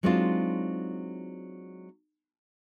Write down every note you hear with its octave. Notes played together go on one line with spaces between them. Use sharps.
F#3 G#3 C4 D4 D#4 F4